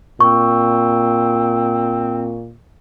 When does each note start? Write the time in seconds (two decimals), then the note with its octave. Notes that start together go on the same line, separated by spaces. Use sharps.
0.20 A#2 C4 C#6